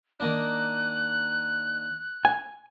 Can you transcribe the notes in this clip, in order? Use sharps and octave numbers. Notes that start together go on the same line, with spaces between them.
D#3 A#3 D4 F#6
G#5